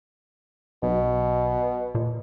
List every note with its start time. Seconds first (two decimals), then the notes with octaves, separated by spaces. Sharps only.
0.83 B1 B2
1.95 A#2